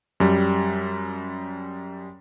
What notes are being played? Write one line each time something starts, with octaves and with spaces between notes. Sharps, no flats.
F#2 G3